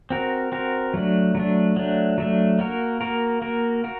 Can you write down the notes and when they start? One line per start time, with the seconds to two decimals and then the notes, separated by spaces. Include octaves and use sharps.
0.10 C4 F#4 A#4
0.52 C4 F#4 A#4
0.94 F#3 A3 D4
1.35 F#3 A3 D4
1.76 F#3 A3 D4
2.18 F#3 A3 D4
2.59 A#3 F#4 A#4
3.01 A#3 F#4 A#4
3.42 A#3 F#4 A#4
3.84 F#4 A#4